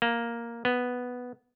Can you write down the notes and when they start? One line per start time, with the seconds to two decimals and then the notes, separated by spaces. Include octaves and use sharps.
0.02 A#3
0.65 B3